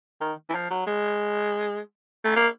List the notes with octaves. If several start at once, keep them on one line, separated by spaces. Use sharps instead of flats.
D#3
E3
F3
F#3
G#3
A3
A#3